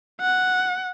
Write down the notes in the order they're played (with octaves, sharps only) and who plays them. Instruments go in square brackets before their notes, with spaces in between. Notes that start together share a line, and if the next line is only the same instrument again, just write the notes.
[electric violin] F#5